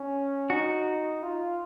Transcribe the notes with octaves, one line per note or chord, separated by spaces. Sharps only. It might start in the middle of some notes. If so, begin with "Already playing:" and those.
Already playing: C#4
D#4 F#4
F4